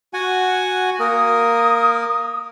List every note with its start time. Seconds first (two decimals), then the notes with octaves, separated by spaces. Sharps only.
0.14 F#4 F#5 G#5
1.00 A#3 A#4 D#6